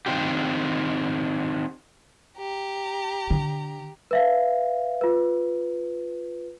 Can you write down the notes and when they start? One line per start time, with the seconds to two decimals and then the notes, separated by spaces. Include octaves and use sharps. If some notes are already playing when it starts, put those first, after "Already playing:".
0.06 D#3 E3 C4 D4 F4 G4
2.38 G4 A#5
3.30 D3
4.11 B4 E5 F5
5.01 F4 B4